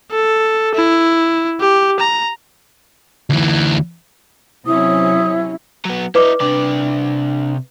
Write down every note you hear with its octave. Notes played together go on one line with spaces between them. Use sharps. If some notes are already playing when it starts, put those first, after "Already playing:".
A4
E4
G4
A#5
D2 E3
C3 F#3 C#4 E4 D#6
F#3 B3
E4 B4 D5 D#5 D6
C3 D4 D5 D6